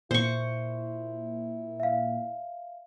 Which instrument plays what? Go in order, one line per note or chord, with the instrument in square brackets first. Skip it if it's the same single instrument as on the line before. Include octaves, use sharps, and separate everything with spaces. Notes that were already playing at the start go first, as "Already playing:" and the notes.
[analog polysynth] A#2 [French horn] E4 [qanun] C5 C#6
[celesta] E5 F5